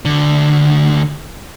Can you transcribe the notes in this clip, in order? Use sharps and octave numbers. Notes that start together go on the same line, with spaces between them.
D2 D3